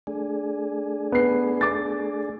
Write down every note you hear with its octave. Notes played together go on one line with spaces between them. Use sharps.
A3 D4 G#4
B3 C7
D6 A6